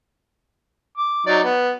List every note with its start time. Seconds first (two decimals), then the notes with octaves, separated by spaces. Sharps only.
0.98 D6
1.27 F#3 D#4 D5
1.44 B3